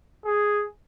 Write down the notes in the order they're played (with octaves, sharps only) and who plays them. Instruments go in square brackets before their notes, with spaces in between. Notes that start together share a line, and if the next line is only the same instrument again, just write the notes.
[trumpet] G#4